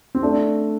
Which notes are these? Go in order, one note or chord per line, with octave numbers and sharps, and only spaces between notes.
C4
A3 D4